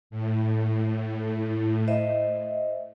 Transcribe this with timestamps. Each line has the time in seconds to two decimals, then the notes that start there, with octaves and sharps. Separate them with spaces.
0.10 A2
1.88 C5 D#5 E5